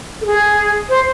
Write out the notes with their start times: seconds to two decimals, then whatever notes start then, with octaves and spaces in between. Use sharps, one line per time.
0.21 A4
0.26 G#4
0.89 C5